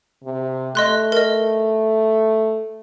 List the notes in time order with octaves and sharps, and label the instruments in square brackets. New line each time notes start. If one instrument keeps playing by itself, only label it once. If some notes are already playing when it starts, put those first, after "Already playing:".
[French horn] C3
[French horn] A3 [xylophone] D#5 C6 F#6
[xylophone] A#4 D#5